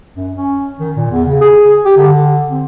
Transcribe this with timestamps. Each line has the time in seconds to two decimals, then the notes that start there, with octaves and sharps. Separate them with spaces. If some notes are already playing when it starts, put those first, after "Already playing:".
0.16 F#2
0.34 C#4
0.80 D#3
0.97 A#2
1.11 E2
1.25 C#3
1.41 G#4
1.85 G4
1.97 D3
2.50 C4